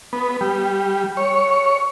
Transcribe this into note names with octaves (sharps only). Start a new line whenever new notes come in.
B3
G3
C#5